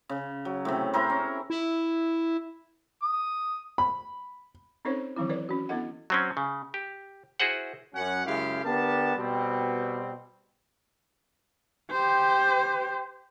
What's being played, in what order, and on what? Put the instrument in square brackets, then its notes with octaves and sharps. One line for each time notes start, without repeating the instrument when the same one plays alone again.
[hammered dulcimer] C#3
F#3
A2 C3
E4 G#4 A#4 C5
C#4
[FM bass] E4
[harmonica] D#6
[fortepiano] B5
[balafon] C4 C#4 D#4 A4 C5 C#5
D#3 E3 F#3 C4 E4
A4 B4 C#5 D5
C#4 F#4
B3 D4 E4 A4 D#5 F#5
[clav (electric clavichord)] F#3 C4 C#4
C#3
G4
E4 F#4 G#4 C5 F#5
[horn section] F#2 C#4 F#5
F#2 C#3 G#3 E4 G4 F5
D3 B3 G4 A#4 A5
B2 G3 C4
[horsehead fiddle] G4 C5